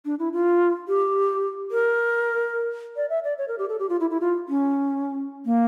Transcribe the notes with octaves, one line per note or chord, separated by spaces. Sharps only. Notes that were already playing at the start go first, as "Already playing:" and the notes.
D4
E4
F4
G4
A#4
D5
E5
D5
C#5
A#4
G4
A4
G4
F4
E4
E4
F4
C#4
A#3